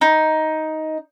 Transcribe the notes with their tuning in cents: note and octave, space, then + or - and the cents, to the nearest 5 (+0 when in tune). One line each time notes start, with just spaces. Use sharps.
D#4 +10